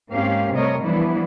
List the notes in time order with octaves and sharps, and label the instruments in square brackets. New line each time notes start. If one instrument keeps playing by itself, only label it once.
[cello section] G#2 A#3 C4 C#4 G4 F5
C3 G3 A3 A#4 C#5 D#5
E3 F3 G3 B3 D4 E4